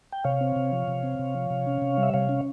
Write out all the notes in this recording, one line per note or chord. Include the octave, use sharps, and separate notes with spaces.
G5
C3 C#5 F5
C4
C3
F3
C3
C4
C3
F3
C3
C#4
C3
G3
E5
C3 C#5 F5
C#4